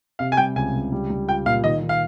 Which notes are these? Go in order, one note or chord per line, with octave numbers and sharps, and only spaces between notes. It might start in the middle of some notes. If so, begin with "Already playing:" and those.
C3 F5
G#5
G3 G5
C#2 G#5
C#2
G3
G3
F4 G5
A#2 F5
D#3 D#5
D#3
F5